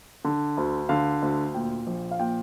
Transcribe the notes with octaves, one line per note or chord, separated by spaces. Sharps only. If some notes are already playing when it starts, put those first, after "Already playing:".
D3
D2
D3 F5
D2
A#2 G5
A#1
F5
A#2 G5